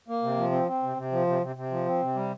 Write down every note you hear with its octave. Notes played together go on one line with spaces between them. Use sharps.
A#3
C3
F3
C4
C4
C3
C3
F3
C3
C3
C3
F3
C4
C3
G3